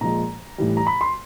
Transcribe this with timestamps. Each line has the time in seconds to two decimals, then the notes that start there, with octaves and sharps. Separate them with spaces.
0.01 A#2 F3 G#3 A#5
0.58 A2 E3 G3
0.77 A#5
0.87 B5
1.01 C6